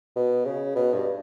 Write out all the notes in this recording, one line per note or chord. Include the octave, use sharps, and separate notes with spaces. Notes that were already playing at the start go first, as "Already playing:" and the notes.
B2
C#3
B2
G2